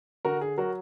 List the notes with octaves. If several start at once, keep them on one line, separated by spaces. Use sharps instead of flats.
D3 F#4 A#4
G#4
F#3 F#4 A#4